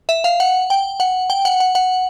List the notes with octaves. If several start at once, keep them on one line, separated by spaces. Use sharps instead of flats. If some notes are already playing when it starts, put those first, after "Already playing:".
E5
F5
F#5
G5
F#5
G5
F#5
F#5
F#5